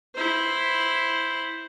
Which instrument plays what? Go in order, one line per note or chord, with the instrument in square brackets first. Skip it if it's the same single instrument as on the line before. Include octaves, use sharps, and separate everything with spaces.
[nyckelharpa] E4 C5